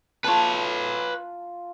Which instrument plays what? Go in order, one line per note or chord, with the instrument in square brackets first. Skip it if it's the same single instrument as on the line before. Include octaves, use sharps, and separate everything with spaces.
[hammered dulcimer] F4 A5 [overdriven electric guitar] B4 C#5